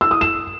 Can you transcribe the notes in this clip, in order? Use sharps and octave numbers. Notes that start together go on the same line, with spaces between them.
E6
D#6
E7